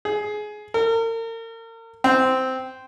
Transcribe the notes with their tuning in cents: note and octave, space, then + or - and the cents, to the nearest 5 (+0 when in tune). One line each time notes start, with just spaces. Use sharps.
G#4 +15
A#4 -40
C4 -10